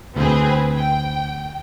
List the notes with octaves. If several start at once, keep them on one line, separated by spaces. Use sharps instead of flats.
D2 C4 G#4 B4
G5